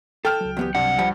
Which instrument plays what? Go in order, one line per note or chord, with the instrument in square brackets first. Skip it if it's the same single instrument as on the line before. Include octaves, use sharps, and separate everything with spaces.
[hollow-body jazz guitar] A4 [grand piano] G5 F6
[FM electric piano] C#2 F#3
[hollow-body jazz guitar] E2 B3 G4
[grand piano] G2 [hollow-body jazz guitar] C3 [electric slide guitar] F#5
[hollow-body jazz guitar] F3 G3 G5